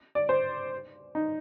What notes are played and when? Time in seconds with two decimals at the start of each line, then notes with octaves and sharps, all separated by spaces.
0.15 D5
0.29 C5
1.15 D#4